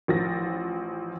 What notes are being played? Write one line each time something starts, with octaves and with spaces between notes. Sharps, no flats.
A1 F3 A6 A#6